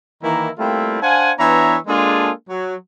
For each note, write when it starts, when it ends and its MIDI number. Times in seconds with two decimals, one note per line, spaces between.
0.23 0.50 51
0.23 0.50 52
0.23 0.50 58
0.23 0.50 64
0.23 0.50 82
0.59 1.00 55
0.59 1.00 57
0.59 1.00 58
0.59 1.00 60
0.59 1.00 64
0.59 1.00 65
1.02 1.32 62
1.02 1.32 72
1.02 1.32 77
1.02 1.32 78
1.02 1.32 80
1.39 1.77 52
1.39 1.77 59
1.39 1.77 62
1.39 1.77 73
1.39 1.77 76
1.39 1.77 82
1.87 2.31 56
1.87 2.31 58
1.87 2.31 62
1.87 2.31 65
1.87 2.31 68
1.87 2.31 69
2.50 2.75 54